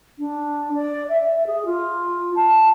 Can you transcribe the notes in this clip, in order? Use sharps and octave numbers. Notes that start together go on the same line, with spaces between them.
D4
D5
E5
G#4
F4
A5